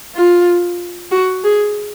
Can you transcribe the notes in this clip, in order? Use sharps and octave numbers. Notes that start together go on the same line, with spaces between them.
F4
F#4
G#4